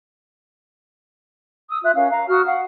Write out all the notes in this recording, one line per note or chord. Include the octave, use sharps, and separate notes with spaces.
D#6 E6
F4 E5 F#6
C#4 A#4 F5
F5 A#5
F#4 D#6 F6
F5 F#5